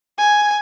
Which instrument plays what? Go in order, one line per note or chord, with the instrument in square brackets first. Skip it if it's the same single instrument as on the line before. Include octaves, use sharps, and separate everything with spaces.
[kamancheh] G#5